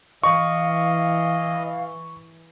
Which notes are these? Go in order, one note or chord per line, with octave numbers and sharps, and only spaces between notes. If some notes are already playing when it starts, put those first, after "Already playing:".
E3 D#5 F5 C#6